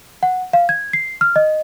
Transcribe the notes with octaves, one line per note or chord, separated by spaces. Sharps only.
F#5
F5
G#6
C7
F6
D#5